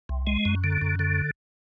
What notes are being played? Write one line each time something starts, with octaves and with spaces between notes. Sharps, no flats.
C2
G#3
F#2
D3
F#2
D3